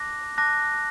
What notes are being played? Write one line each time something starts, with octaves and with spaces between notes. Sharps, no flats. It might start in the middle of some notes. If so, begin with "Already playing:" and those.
Already playing: A5 D6 F#6 A#6
A5 D6 F#6 A#6